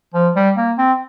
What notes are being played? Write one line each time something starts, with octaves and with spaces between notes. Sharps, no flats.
F3
G3
A#3
C4